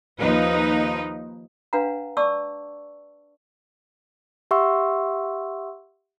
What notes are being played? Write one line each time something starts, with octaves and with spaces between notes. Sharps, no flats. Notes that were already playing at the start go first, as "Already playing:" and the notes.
D#2 F3 D#4 B4
D4 B4 F5 F#5 A#5
D5 A5 C#6 D6 E6
G4 E5 F#5 C6 C#6 E6